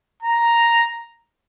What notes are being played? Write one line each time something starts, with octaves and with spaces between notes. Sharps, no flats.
A#5